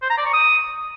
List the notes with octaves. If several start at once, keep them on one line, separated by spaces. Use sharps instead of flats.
C5
A#5
D5
C#6
D#6